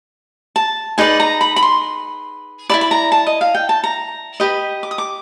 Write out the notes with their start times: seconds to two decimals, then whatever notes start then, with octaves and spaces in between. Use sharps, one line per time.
0.56 A5
0.98 D#4 G#4 B4 D5 G#5
1.20 A#5
1.41 B5
1.56 B5
1.62 C6
2.70 E4 A4 D5 B5
2.81 B5
2.91 A#5
3.12 A5
3.27 D#5
3.41 F5
3.55 G5
3.69 A5
3.84 A#5
4.40 G4 B4 D#5
4.83 D6
4.91 D#6
4.98 D6